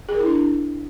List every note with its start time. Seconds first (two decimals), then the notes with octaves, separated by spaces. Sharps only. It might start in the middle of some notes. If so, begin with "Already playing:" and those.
0.09 G#4
0.14 A#4
0.20 E4
0.26 D4